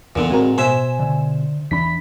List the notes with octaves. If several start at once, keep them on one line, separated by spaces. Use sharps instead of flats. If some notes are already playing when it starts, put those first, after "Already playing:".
D#1 E2 A#2 D3 E3 B3
A2 G#3 C4 F#4 A#4
B2 C5 E5 G#5
D3
E2 E3 D4 B5 B6